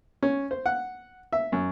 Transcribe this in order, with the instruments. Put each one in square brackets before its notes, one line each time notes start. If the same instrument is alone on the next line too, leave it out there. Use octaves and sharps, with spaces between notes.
[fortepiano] C#4
C5
F#5
E5
F#2